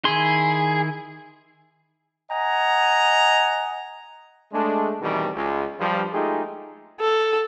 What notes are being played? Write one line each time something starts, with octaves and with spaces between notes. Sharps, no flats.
D#3 E4 G#4 C6
D#5 F#5 G#5 A#5
G#3 A3 D4
B2 D#3 E3 G3 A3 C4
C#2
G2 F3
G#3 A3 D#4 F4 G4 G#4
A4